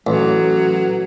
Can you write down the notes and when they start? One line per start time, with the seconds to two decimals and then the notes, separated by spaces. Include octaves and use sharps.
0.07 A1 F#3